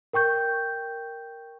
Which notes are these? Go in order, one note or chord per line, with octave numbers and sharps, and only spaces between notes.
A#4 G5 C#6 G6